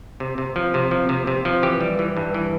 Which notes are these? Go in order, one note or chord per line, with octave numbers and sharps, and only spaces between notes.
C3
C3
F3
C3
F3
C3
C3
F3
E3 G4
G3
E3
G2
E3